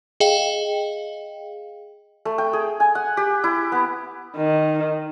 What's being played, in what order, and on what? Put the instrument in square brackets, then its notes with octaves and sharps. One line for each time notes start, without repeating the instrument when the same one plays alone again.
[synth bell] G#4 D#5 F5 G5
[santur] A3
G5
G#4
G#5
F#5
G4
E4
B3
[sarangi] D#3